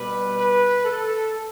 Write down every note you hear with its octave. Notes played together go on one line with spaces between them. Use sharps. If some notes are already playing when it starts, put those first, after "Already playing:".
Already playing: B2 G3 B4
B4
A4